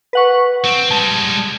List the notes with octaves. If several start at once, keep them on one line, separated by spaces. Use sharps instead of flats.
B4 F#5 C#6
C4
G3 G#3 A5